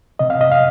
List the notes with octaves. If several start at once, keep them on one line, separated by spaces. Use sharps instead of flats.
C3 D#5
F5
D#5
F5